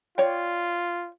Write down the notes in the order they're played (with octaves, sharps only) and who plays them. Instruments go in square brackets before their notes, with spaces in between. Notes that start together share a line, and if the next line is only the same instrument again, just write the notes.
[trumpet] F4 [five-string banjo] C#5 D5 G5